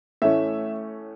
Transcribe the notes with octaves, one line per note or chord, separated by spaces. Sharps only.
A2 E3 A3 C#4 E5